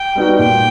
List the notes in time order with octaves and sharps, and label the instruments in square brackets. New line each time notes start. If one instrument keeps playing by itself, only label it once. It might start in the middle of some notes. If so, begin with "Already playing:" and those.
Already playing: [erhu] G5
[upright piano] G3 B3 D#4 F#4
[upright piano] A#2 [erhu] G5